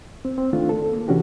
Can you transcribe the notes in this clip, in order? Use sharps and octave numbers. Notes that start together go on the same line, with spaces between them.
C4
C4
D#3 A3 D4 F4
A4
A#3
C3 E3 C#4 D4 F#4 G4